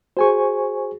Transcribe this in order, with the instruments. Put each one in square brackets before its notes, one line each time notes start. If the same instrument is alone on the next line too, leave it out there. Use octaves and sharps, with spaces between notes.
[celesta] F#4 G#4 [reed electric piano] C5 G#5 C#6